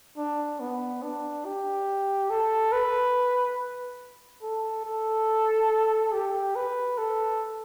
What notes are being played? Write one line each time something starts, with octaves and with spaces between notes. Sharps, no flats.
D4
B3
D4
G4
A4
B4
A4
A4
G4
B4
A4